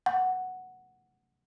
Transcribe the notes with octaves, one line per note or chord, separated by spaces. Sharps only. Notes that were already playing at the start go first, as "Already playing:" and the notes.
F#5